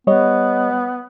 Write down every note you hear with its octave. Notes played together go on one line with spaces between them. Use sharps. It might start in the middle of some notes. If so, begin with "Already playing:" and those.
G3 B3 C#5 D#5